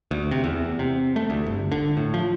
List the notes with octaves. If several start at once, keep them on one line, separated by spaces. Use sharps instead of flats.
D2
C3
E2
C3
A3
D2
G1
D3
A2
F3